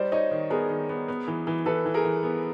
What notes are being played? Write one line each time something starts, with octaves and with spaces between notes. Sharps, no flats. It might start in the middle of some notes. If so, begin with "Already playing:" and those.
Already playing: G3 D#4 C5 D5
D#4 C#5 D#5
D#3
B3 G#4 A#4
D#3
B3
B3
E3
E3
E3 A4 B4
E3
G#4 A#4
E3
B3